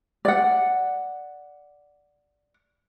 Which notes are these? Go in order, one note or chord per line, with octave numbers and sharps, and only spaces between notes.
D5 F#5